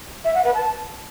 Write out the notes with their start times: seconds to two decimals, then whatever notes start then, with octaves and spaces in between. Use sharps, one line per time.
0.25 E5
0.35 F#5
0.44 B4
0.54 A5